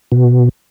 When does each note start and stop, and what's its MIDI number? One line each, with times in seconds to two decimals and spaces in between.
0.12 0.49 47